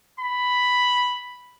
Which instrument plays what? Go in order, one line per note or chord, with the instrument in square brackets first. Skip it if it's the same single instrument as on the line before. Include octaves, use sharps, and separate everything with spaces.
[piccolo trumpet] B5